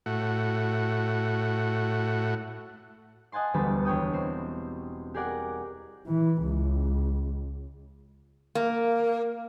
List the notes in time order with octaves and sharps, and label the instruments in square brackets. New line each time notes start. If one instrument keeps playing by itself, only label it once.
[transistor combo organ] A2 F#4
[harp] D#5 F#5 G#5 A5 C6
E1 D2 G3 B3 B5 A6
E1 C#5 G5 D#6
C4 C6
G4 G#4 A#4 D5 F#5
[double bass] E3
C#2
[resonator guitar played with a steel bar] A#3